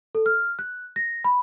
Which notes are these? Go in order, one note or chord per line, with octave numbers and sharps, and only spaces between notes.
A4
F6
F#6
A#6
B5